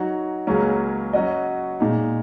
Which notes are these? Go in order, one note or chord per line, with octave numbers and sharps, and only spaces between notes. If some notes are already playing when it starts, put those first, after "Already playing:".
Already playing: F#3 D#4 F#4 C#5
C#2 C#3 F#3 A#3 C#4
F#3 C#4 F#4 D#5
A#2 G#3 D#4